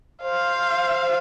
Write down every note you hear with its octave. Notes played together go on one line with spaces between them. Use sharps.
C5 F5